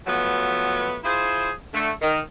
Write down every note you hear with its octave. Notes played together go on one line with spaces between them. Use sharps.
F3 F#3 A3 B3
E4 F4 G#4 C5
D3 A3
D#3